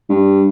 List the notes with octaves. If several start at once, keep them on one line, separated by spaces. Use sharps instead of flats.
G2